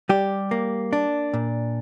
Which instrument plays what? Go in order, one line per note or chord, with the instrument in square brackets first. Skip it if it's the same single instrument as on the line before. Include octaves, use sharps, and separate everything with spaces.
[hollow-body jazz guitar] G3 G4
A#3
D4
A#2